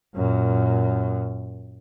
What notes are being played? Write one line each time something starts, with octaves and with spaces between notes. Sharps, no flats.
F#2 A#2